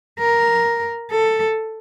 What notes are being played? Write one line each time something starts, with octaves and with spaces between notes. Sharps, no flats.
A#4
A4